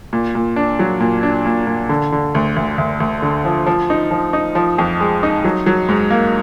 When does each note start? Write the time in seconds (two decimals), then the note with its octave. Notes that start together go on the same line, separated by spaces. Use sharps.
0.13 A#2
0.35 A#2
0.56 D4
0.79 F#3
1.00 A#2
1.23 D4
1.46 A#2
1.67 A#2
1.89 D3
2.12 D3
2.35 D2
2.56 D2
2.78 D2
3.00 D2
3.22 D3
3.45 F3
3.67 F3
3.90 D#4
4.11 F3
4.33 D#4
4.55 F3
4.78 F2
5.00 G#3
5.23 D#4
5.44 F#3
5.66 F#3
5.89 G#2
6.11 A#3